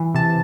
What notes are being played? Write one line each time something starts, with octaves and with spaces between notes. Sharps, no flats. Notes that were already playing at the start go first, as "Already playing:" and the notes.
Already playing: E3
C3 A5